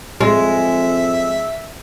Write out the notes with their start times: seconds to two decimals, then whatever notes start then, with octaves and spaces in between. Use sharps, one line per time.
0.21 F2 G#3 E5